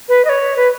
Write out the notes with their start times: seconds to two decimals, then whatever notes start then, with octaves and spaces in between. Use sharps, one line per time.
0.09 B4
0.25 D#5
0.29 C#5
0.57 B4